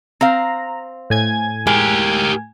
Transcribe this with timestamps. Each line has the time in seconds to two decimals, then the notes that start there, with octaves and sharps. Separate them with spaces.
0.21 C4 F5 A#5
1.10 A2 G#5 G#6
1.67 G#3 G4 A#4